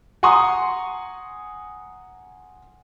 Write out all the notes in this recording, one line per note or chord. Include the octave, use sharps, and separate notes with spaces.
F#5 G#5 A#5 C6 C#6 D#6